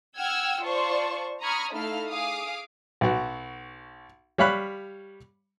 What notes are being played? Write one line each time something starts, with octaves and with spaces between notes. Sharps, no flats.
F#5 G5 E6 F6 G#6
F4 C5 D5 A5 C#6
A#5 B5 C#6 D#6 F6 G#6
A3 D#4 E4 A4 F5 F6
G#4 F5 D6 D#6
B1 F#4
G3 C#5 F5 B5 F#6